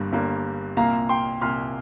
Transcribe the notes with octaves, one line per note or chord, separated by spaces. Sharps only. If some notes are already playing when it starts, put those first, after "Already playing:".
Already playing: G1 G2 G3 A#3
G1 G2 G3 A#3
C2 A#2 A#3 F5 A#5
G5 C6
C2 A#2 A#3 C6 F6